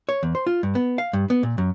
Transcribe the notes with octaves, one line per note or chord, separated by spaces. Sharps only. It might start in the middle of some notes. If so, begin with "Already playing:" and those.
C#5
E2
C5
F4
G2
B3
F5
G2
B3
A#2
F#2